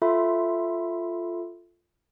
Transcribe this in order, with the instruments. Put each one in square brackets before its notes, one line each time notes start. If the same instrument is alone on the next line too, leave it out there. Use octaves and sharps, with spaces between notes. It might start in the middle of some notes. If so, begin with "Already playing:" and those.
[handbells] F4 A4 E5 B5 C6